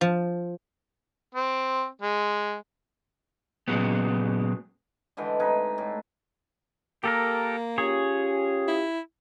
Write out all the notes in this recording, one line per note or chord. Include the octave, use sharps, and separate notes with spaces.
F3
C4
G#3
A#2 C#3 F3 F#3 G#3 B3
D3 E3 G#3 G5
C3 D#4 B4 G#5
A2
A#3 G4 A4 A#4
C#4 F4 G4 G#4 C#5
E4